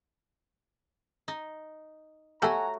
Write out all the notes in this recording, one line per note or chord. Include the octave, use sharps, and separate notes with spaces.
D#4
A3 F#4 G4 A4 C#5 F#5 G#5 A#5